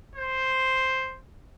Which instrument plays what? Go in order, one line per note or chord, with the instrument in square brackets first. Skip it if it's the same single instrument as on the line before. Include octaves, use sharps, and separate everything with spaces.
[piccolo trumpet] C5